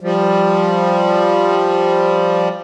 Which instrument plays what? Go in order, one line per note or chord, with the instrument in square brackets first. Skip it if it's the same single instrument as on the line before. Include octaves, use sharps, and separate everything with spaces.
[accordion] F3 G3